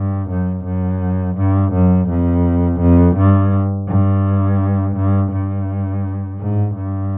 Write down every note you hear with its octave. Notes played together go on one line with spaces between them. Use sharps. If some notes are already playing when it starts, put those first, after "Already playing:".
Already playing: G2
F#2
F#2
G2
F#2
F2
F2
G2
G2
G2
G2
G#2
G2